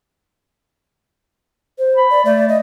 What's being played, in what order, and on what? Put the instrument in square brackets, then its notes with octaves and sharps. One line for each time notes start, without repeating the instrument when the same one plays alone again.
[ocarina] C5
[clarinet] B5
[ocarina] D5
[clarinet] A3 [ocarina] D5
[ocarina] D#5